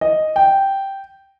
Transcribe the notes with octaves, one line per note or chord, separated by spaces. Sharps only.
D#5
G5